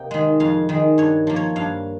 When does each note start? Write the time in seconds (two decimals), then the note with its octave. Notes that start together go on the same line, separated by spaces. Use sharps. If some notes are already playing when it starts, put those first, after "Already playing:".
Already playing: C3 A#3 D#5 G5
0.11 D#3 G#3
0.40 F2 F5
0.69 D#3 G#3
0.98 G2 C#5
1.27 F3 A#3
1.36 C#5
1.56 G2 F5